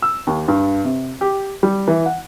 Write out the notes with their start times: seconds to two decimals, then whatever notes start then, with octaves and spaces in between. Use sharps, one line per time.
0.02 E6
0.27 D#2
0.48 G2
0.84 C3
1.21 G4
1.63 G3
1.88 E3
2.06 F#5